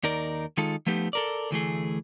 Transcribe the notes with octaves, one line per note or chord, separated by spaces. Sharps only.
D#2 D#4 A#4 D5
D#3 G#3 D#4 F4 A4
F3 A3 B3 D#4 G4
A4 A#4 D5
D2 E3 A3 G#4